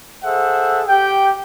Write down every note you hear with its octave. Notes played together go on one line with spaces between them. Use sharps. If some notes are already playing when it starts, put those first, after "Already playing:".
G#4 A4 C5 E5 F#5
G4 G5